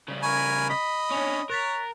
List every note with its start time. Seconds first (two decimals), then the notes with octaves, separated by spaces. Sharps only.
0.08 C#3 G3
0.23 A#4 G#5 B5 C#6
0.70 D#5 B5 B6
1.11 C#4 D4 C#5 G#5
1.49 A#4 C#5 F#6 A6 B6